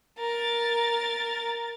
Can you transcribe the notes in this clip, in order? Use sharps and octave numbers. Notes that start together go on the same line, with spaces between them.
A#4 A6